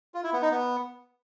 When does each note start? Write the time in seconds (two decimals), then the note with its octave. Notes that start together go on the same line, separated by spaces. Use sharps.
0.14 F4
0.24 E4
0.33 B3
0.42 D#4
0.51 B3